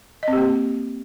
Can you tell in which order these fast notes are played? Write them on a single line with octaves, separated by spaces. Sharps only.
D#5 C4 G4 A#3